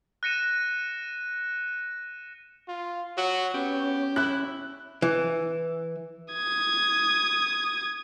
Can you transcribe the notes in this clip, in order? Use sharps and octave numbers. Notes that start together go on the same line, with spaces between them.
F#6 A#6 C#7 D#7 E7
F4
F#3 F#4
B3 C#4 G4
E4 F#6
E3
D#6 G#6